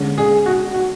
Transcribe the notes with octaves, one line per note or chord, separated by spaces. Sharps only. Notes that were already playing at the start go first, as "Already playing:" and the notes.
Already playing: D3 G#3 C#4
G#4
F#4
F#4